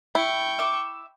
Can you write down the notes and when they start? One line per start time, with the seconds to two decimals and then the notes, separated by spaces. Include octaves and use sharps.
0.15 E4 G5 C#6
0.59 E5 D6